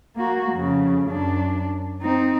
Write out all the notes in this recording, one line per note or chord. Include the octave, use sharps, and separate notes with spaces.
A#3 F#4
F2 C#3
F#2 D4
C4 D#4